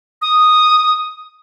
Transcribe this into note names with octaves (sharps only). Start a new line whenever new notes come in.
D#6